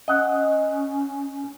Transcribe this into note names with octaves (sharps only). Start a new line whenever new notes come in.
C#4 D#5 F#5